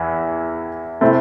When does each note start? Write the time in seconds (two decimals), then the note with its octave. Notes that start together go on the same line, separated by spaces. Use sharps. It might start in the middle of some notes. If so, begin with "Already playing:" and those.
Already playing: E2 E3
1.01 C3 A3 C4 E4